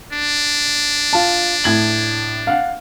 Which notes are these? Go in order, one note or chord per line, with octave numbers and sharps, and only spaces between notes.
D4
F4 A5
A2 G#6 F#7
F5 F#5